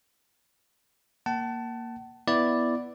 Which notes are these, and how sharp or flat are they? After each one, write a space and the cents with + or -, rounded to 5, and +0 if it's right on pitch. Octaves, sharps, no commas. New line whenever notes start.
A#3 +0 F#5 +40 A5 +0
B3 +0 E4 +0 D5 +0